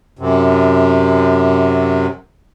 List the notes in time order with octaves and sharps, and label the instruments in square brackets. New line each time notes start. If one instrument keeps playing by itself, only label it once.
[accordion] F#2 C3